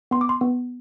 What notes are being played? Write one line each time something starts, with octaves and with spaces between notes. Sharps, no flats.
B3 C6
D6
C6
B3